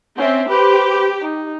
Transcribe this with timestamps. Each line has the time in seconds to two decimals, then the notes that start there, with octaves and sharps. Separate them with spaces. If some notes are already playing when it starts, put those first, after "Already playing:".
0.18 C4 C#4 E5
0.49 G4 B4 C5
1.22 D#4